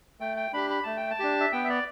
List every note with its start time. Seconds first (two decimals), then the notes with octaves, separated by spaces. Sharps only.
0.20 A3 G5
0.37 G5
0.53 D4 G4 B5
0.70 B5
0.83 A3 A5
0.97 G5
1.11 A5
1.19 D4 G4
1.40 E5
1.52 B3 G5
1.64 E5
1.69 D5